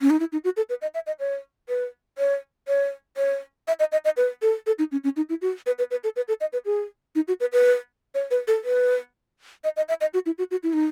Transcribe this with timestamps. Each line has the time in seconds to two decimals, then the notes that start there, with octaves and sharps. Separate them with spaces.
0.01 C#4
0.10 D#4
0.20 E4
0.32 D#4
0.44 F#4
0.57 A4
0.69 B4
0.82 D#5
0.94 E5
1.07 D#5
1.19 C#5
1.69 B4
2.18 C#5
2.68 C#5
3.17 C#5
3.68 E5
3.80 D#5
3.92 D#5
4.05 D#5
4.17 B4
4.42 A4
4.66 A4
4.79 D#4
4.92 C#4
5.04 C#4
5.16 D#4
5.29 E4
5.42 F#4
5.66 B4
5.79 B4
5.91 B4
6.04 A4
6.16 B4
6.28 A4
6.41 D#5
6.53 B4
6.65 G#4
7.15 D#4
7.28 F#4
7.40 B4
7.53 B4
8.15 C#5
8.31 B4
8.48 A4
8.64 B4
9.64 D#5
9.77 D#5
9.89 E5
10.01 D#5
10.14 F#4
10.26 E4
10.38 F#4
10.51 F#4
10.63 E4
10.73 D#4